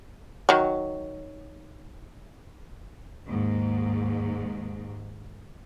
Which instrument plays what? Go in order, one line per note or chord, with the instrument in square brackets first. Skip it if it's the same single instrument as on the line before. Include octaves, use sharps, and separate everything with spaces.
[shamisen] D#3 F#3
[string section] D#2 G#2